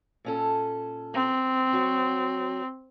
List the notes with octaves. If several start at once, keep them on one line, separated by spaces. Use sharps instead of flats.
A#2 C#4 A4
C4
F#3 F#4 C#5